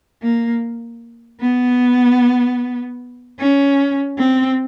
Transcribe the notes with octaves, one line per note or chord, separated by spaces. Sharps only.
A#3
B3
C#4
C4